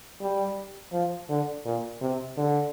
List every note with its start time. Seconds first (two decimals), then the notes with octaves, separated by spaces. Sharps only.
0.21 G3
0.92 F3
1.29 D3
1.65 A#2
2.01 C3
2.37 D3